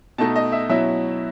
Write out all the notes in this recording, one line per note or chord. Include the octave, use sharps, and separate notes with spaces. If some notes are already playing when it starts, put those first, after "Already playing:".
B2 A3 D#4 A5
D#5
E5
B2 F#3 C#4 E4 E5